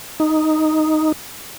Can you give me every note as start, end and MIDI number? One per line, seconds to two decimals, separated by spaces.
0.20 1.12 63